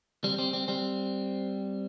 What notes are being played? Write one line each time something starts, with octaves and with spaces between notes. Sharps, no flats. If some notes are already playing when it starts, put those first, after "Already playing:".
G3 C4
G3 C4
G3 C4
G3 C4